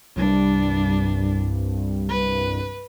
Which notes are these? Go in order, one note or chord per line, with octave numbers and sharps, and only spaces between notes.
C2 G2 G3 D4
B4